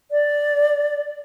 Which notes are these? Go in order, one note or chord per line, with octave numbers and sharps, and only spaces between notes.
D5